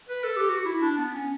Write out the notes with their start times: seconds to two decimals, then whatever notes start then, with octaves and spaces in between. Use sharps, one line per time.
0.09 B4
0.24 A4
0.36 G4
0.49 F#4
0.65 E4
0.82 D4
0.98 B3
1.14 C#4